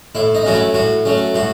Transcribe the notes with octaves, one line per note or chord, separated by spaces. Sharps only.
A2 E4
D#4
F#3 A3 C#4 F#4
E4
A2 F#4
F#3 A3 C#4
A2 F#4